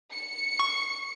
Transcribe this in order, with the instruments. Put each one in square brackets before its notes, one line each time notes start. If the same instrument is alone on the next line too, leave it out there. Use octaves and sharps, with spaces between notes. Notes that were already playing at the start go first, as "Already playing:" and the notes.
[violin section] C#7
[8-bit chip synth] C#6